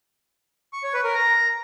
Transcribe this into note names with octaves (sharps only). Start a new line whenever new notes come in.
C#6
C#5
B4
A#4
A#5